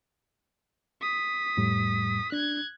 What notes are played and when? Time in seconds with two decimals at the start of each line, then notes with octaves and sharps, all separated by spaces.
1.01 D#6 B6
1.57 F2 A2 G3
2.32 D4 F#6 G#6